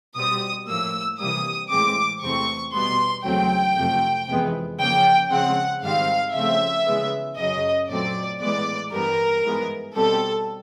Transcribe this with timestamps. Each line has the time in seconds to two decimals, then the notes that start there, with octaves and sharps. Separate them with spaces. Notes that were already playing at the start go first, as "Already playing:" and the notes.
0.15 B2 G3 C4 D#6
0.67 A2 F3 A#3 E6
1.19 C3 E3 G3 A#3 D#6
1.70 A2 E3 G#3 C4 D6
2.22 E2 C3 E3 A3 C4 C#6
2.73 B2 G3 B3 C6
3.25 E2 C#3 F#3 A3 C4 G5
3.76 F2 C3 F3 A3
4.28 F2 C3 E3 G#3 B3
4.79 C#3 F3 A#3 G5
5.31 C#3 F3 G#3 C4 F#5
5.82 G#2 D#3 G3 C4 F5
6.34 C#3 F3 A3 C4 E5
6.86 C#3 E3 G#3 B3
7.37 F#2 C#3 F#3 D#5
7.89 A#2 F#3 A3 C4 D5
8.40 A2 E3 G#3 B3 D5
8.92 G2 E3 G3 B3 A#4
9.44 G#2 E3 G#3 B3
9.95 B2 G3 C4 A4